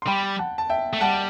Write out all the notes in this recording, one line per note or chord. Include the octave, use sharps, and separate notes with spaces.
C6
G3 G5 B5
F#5 A5
A5
E5 G5
A3
G3 F#5 A5